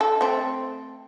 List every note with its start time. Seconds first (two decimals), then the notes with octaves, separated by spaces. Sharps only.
0.01 A4
0.21 A3 C4